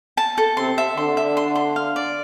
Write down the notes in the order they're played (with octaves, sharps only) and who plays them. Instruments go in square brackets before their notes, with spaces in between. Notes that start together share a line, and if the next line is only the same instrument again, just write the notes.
[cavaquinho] A5
A4
[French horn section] C3 C4 [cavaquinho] C6
[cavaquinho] E5
[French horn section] D3 D4 [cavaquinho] C6
[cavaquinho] E5
C6
C6
F5
D5